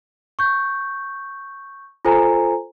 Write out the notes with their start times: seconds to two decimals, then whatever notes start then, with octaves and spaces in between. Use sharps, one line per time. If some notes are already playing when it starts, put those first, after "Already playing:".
0.39 C#6 G6
2.05 F4 A4 C5 G#5 A#5